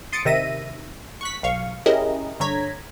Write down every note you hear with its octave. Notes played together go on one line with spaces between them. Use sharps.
C6 D#6 A6 C#7 D7
C3 D#3 E5 A#6 D#7
C#6 F#6 B6
B1 F5 C#6
C#4 E4 G4 G#4 A#4 D#5
G2 D3 C#5 A#5 G#6 B6